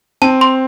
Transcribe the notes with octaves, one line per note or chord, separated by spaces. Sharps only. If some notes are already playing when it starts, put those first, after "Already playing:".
C4 A5
C6